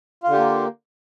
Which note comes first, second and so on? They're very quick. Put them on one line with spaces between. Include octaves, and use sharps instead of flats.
F4 D3 G4 A#3